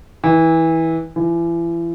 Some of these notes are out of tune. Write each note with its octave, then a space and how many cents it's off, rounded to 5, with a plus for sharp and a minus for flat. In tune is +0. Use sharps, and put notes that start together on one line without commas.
E3 -20
E3 +35